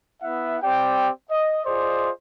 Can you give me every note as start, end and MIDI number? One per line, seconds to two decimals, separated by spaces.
0.23 0.57 59
0.23 0.57 64
0.23 0.57 76
0.23 0.57 78
0.63 1.10 60
0.63 1.10 67
0.63 1.10 74
0.63 1.10 79
1.31 1.62 75
1.65 2.10 65
1.65 2.10 68
1.65 2.10 72
1.65 2.10 74
1.65 2.10 75